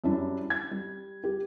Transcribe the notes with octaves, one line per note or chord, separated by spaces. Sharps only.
F#2 G3 D4 E4
G#6
G3
G4